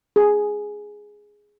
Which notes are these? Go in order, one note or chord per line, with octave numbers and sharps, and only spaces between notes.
G#4